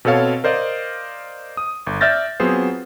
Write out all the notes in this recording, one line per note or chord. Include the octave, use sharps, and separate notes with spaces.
B2 C4 A4 C#5 F5
A#4 C5 D5 D#5 F5
D#6
G1
D5 E5 F6 G6 A6 A#6
F#3 B3 C4 F4 G#4 C5